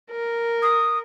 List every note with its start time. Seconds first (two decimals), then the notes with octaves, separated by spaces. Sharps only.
0.10 A#4
0.62 D#6